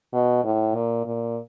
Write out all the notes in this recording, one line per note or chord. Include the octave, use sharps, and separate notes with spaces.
B2
A2
A#2
A#2